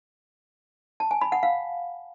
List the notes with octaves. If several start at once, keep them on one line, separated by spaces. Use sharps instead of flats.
A5
G#5
B5
F#5
F5